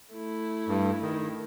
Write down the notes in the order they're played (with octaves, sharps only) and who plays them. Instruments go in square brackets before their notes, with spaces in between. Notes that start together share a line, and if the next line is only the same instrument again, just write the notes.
[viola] A3 E4
[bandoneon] G2
D#3